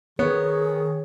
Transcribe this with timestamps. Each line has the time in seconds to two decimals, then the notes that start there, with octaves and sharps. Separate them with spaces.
0.19 D#3 B3 G#4 C#5